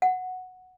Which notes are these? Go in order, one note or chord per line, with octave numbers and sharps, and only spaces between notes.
F#5